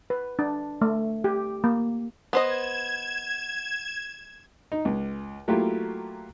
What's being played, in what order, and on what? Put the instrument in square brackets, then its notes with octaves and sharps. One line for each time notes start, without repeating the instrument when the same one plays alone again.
[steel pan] B4
D4
A3
G4
A#3
[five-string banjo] B3 C5 D#5 [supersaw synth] G#6 E7
[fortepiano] D#4
C#2
F#3 A3 A#3 E4 F4 G4